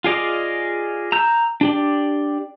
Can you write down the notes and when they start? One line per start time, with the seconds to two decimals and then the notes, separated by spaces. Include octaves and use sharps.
0.04 F4 G#4 D5 D#5 F5
1.12 A#5 E6 G6
1.61 D4 G4 D5